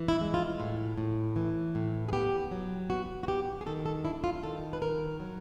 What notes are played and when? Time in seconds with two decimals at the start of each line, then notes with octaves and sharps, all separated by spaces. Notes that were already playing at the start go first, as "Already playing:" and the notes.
Already playing: E3
0.08 E4
0.21 G#3
0.34 F4
0.60 A2
0.98 A2
1.36 E3
1.75 A2
2.09 G#4
2.13 B3 G4
2.51 F#3
2.90 B3 F#4
3.23 F#4
3.28 B3 G4
3.61 G#4
3.66 D#3 A4
3.86 A4
4.05 D4 E4
4.24 F4
4.43 D#3 A4
4.73 B4
4.81 D#3 A#4
5.20 F#3